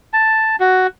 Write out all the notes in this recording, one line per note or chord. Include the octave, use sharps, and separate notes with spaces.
A5
F#4